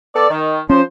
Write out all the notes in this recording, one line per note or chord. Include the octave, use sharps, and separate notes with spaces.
B3 A4 D5
D#3
F3 C#4 C5